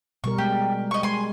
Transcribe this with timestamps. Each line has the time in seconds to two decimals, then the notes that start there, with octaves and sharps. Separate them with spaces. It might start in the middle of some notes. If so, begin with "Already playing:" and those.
0.24 B2 G3 A#4 C#6
0.38 G#3 G4
0.91 D#5 C#6
1.03 G#3 G#5 C6